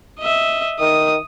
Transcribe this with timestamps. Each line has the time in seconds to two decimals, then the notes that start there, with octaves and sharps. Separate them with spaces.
0.20 D#5 E5
0.80 D#3 D#6